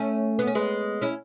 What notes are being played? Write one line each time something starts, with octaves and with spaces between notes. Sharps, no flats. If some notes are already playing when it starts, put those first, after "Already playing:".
Already playing: A3 C#4
B3
C#4
G#3 B3
C#4 E4